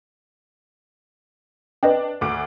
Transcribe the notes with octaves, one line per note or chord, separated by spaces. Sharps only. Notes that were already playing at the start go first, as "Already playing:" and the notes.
D4 B4 D#5 G5
D2 D6 D7